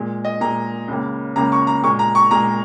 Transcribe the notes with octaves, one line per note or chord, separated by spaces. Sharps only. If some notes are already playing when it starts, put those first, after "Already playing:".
Already playing: A#2 G#3
D#5
A#2 G#3 A#5
C#2 C#3 A#3
C#2 C#3 A#3 A#5
C#6
A#5
A#2 G#3 C#6
A#5
C#6
A#2 G#3 A#5